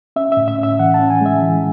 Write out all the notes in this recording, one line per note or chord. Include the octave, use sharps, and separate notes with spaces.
C#4 E5
A2 E5
E5
C#4 E5
E3 F#5
A5
C#4
G#5
G#3 E5
E3